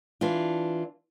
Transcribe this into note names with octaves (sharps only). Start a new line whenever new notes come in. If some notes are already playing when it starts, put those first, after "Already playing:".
E3 D4 F4